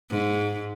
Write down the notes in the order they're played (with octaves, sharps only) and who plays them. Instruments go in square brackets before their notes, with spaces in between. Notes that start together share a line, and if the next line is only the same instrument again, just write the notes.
[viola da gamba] G#2